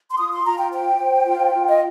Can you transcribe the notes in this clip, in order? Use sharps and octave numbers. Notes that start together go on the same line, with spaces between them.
C6
F4 D#6
C6
F4 A#5
G5
C5 G5
C5
F4
F4
D#5